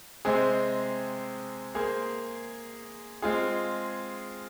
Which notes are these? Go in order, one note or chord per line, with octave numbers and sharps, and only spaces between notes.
C3 G#3 C4 G#4 C5
A#3 G#4 C5
G#3 C4 F4 G#4